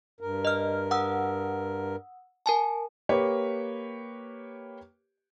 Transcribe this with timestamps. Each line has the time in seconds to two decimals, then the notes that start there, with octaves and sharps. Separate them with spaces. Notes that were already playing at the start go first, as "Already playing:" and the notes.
0.21 G2 A#4
0.45 D#5 F6
0.91 F#5 D#6 E6
2.46 A#4 G#5 A5
3.09 A#3 G4 B4 C#5